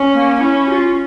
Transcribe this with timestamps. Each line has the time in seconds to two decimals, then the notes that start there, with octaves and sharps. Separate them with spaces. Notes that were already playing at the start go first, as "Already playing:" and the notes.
Already playing: C#4
0.14 A#3
0.40 C#4 E4
0.68 G4
0.71 F4